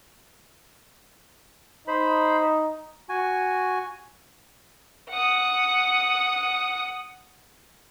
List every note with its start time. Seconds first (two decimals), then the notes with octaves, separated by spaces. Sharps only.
1.88 D#4 C5 B5
3.09 F#4 G#5
5.10 F#5 D#6